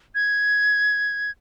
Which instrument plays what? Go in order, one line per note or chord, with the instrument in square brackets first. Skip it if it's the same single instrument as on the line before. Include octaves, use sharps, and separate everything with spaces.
[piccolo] G#6